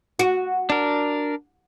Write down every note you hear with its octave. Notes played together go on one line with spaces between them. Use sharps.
F#4
D4 A#4